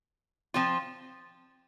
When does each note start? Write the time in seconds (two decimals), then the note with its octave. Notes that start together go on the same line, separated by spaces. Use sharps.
0.54 F3 C4 F4